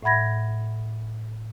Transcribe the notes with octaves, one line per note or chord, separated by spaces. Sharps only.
A2 E5 F#5 B5 G#6 A#6